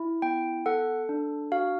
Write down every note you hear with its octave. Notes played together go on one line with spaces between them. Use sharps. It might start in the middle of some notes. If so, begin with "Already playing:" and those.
Already playing: E4
B3 G5
A4 F#5
D4
F#4 F5